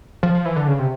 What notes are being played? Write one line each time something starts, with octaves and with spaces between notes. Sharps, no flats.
F3
F3
E3
D3
C#3
C3